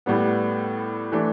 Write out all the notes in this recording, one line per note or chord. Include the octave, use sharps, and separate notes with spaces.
A2 G3 B3
E3 A3 D4